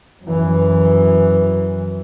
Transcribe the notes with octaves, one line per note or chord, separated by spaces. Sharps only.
F#2 E3